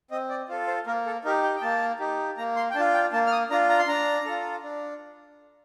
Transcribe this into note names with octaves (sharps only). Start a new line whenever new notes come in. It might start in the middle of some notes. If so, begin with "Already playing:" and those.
C4 D#5
D5
F4 A4 C5
C5
A#3 A#4
A4
D#4 G4 A#4
G5
G5
A#3 A5
D#4 G4
A#3 A#5
C6
G5
D4 F4 A5
G5
A#3 A5
F6
D#6
D4 F4 A#5
A#5
C6
D4 A#5
F4 A4
D4